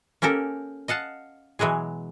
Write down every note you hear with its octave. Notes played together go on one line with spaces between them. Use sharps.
A#3 C#4 G4 A4 A#4
D#5 F5 F#5 A5
B2 E3 F#3 G#3 G#4